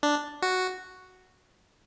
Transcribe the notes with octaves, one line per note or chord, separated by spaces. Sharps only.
D4
F#4